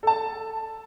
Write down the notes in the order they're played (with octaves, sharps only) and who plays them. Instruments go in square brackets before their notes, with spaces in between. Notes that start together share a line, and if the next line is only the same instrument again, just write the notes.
[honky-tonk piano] A4 A5